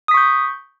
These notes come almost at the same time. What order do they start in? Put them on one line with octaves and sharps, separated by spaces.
D#6 B6 C#6 G6